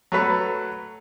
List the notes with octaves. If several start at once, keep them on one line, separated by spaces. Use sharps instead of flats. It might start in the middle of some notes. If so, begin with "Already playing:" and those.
F#3 A3 B4